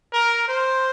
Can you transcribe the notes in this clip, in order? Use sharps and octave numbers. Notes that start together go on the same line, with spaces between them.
A#4
C5